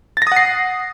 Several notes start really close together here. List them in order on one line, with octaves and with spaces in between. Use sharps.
A6 A#6 D#6 F#5 C7